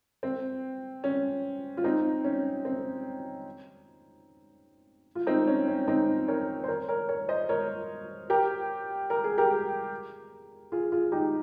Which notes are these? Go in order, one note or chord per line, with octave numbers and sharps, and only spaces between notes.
C4
C#4
F4
C4 D#4
C#4
C4
F4
C4 D#4
C#4
C#4
C4 D#4
A#4 C#5
C5
A#4 C#5
A#4 C#5
A#4 C#5
C5 D#5
A#4 C#5
G4 A#4
A#4
G#4
G4 A#4
F4 G#4
F4 G#4
D#4 G4